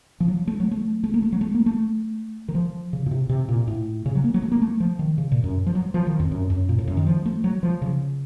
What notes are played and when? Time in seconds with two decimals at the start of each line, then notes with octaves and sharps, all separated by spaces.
0.20 F3
0.28 F#3
0.47 A3
0.60 F#3
0.71 A3
1.04 A3
1.14 A#3
1.22 A3
1.32 F#3
1.41 A3
1.55 A#3
1.66 A3
2.48 D#3
2.55 F3
2.93 C#3
3.06 A#2
3.11 C3
3.29 C3
3.49 A#2
3.67 A2
4.06 C#3
4.15 F#3
4.24 A#3
4.34 F#3
4.42 A3
4.52 A#3
4.61 A3
4.80 F3
4.99 D#3
5.18 C#3
5.32 A#2
5.44 F#2
5.66 F3
5.75 F#3
5.94 F3
6.07 D#3
6.20 F2
6.31 F#2
6.50 F#2
6.69 A#2
6.79 A2
6.88 F#2
6.97 D#3
7.07 F3
7.26 A3
7.44 F#3
7.63 F3
7.82 C#3